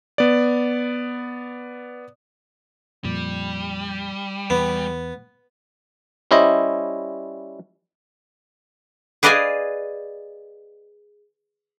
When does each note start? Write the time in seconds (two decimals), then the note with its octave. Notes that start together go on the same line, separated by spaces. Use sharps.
0.18 B3 D5
3.04 F2 A#2 G3
4.50 E2 B3
6.31 G3 C#4 E4 C5 D#5
9.23 G#4 B4 D5 D#5 F5 G#5